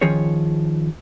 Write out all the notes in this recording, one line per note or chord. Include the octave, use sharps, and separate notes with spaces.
D#3 F3 C#4 G#4 C#5